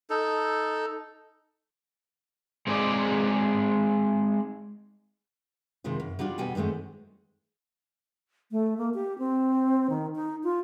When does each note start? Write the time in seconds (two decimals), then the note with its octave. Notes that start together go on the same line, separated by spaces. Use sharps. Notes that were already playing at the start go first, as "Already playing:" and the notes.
0.10 D#4 A4
2.67 G#3 C4 D#4 G#4 D5
5.84 C3 D#3 E3 G#3 F4
6.00 F#2
6.19 F#3 G3 B3 D4 F4
6.38 B2 F#3 G3 G5 G#5
6.55 G2 D#3 G#3 A3 C4
8.52 A3
8.78 A#3
8.94 G4
9.19 C4
9.90 D#3
10.16 D#4
10.43 F4